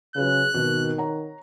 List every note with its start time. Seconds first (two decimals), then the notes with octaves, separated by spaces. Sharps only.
0.16 C#3 F#3 G#4 B4 F#6
0.54 G#1 B2 D#3
0.98 C#5 F#5 A#5